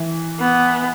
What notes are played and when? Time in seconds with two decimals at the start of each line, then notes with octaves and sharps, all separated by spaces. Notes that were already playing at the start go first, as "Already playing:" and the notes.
Already playing: E3
0.40 B3